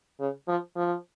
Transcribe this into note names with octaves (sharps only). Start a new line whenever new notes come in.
C#3
F3
F3